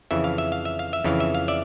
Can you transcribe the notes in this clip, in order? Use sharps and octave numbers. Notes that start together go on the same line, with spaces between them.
F2 C#3 E3 E5
F5
E5
F5
E5
F5
E5
F2 C#3 E3 F5
E5
F5
D5 E5